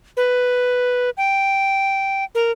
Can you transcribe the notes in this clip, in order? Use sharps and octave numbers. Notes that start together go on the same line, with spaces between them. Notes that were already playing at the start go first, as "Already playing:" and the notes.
B4
G5
A#4